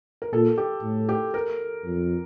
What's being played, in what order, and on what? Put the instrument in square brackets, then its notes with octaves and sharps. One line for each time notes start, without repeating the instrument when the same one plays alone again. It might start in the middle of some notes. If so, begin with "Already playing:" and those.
[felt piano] A#4
[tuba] A#2 [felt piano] A4
[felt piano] G4
[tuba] A2
[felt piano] G4
A#4
[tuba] F2